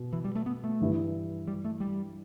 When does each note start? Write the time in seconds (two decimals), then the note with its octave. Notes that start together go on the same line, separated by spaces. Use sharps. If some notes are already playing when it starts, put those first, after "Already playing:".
Already playing: B2
0.13 E3
0.24 G3
0.35 A3
0.46 B3
0.64 A3
0.80 G2 E3 G3 E4
1.48 G3
1.64 A3
1.80 G3